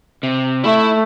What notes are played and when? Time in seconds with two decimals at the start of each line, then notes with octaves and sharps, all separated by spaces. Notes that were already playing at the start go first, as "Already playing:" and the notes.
0.23 C3
0.64 A3 E4 E5